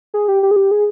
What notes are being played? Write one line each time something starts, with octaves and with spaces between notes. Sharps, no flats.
G#4
G4
G4
G#4
G4
G#4